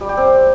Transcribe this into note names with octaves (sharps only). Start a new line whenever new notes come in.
G3
G4
C4